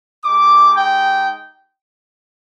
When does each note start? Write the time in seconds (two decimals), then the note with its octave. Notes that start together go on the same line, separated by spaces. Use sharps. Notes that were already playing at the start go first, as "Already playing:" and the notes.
0.24 G#3 D#4 G4 D6
0.75 G5